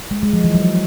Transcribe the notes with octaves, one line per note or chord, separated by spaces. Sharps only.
G#3
G#3
F3
E3
F#3